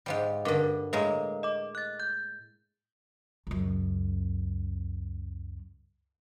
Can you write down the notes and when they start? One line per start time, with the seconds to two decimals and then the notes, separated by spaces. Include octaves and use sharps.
0.06 G#2 F3 G3
0.45 G2 D3 A#4 D6
0.93 A2 G#3 A#3 B4
1.43 D#5 D6
1.75 F#6 A6
2.00 G6
3.47 C#2 F#2